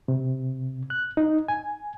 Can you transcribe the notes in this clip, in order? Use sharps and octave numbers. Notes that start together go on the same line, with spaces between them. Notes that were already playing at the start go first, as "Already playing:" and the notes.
C3
F#6
D#4
G#5